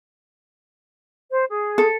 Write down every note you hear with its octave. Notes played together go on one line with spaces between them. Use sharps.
C5
G#4
A4